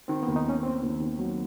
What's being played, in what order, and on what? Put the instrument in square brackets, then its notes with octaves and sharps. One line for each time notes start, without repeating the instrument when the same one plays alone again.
[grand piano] D#3 [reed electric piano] C4
[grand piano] D#2 [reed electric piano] B3
[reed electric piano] D#4
[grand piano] D#3 [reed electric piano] C#4
[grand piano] D#3 [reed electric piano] C4
[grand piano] D#2
D#3
F#3